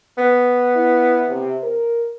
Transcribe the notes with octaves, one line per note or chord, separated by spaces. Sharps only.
B3
E4
C3
A#4